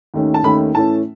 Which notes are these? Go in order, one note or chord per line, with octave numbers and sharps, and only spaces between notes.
D#2 D#3 A3 C#4
A5
D#2 D#3 A3 C#4 B5
A2 E3 A3 C#4 A5